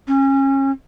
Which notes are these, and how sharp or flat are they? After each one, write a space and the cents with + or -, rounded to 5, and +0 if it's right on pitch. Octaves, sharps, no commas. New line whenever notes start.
C#4 -25